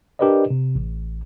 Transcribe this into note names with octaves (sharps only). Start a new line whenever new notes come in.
D4 G4 A#4 B4 D5 D#5
C3
A1